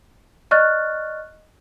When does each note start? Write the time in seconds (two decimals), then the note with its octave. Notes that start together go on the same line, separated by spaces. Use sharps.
0.51 D5 D#5 C#6 F6 F#6 A6